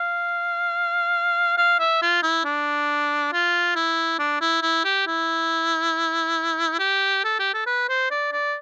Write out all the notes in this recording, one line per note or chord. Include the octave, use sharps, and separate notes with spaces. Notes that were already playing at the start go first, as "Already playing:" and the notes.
Already playing: F5
F5
E5
F4
E4
D4
F4
E4
D4
E4
E4
G4
E4
G4
A4
G4
A4
B4
C5
D5
D5